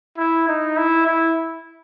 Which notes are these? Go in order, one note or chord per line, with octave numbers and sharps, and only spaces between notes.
E4
D#4
E4
E4